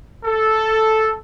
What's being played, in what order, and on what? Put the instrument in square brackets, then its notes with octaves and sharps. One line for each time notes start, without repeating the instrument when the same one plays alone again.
[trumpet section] A4